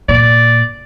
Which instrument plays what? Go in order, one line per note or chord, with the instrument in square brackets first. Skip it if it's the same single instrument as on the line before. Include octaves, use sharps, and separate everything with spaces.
[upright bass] A#2 [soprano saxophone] D5